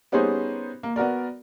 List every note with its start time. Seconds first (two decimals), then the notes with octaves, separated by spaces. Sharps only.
0.12 G3 B3 C#4 D#4 G#4 C5
0.83 A#3
0.96 B3 F#4 A#4 D5